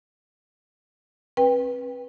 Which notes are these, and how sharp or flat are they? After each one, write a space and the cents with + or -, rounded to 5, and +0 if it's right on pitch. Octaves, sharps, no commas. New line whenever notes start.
C4 +40 B4 -10 G5 +25